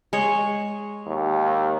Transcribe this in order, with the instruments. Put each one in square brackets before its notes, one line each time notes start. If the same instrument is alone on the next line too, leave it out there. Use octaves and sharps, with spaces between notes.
[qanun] G#3 C#5
[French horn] D#2